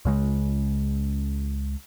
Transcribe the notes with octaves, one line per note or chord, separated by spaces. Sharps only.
C#2 C#3 G#3